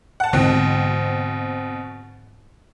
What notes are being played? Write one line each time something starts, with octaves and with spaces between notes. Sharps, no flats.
F#5 A5
G#2 B2 D3 E3 C4